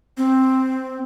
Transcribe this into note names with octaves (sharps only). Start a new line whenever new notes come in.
C4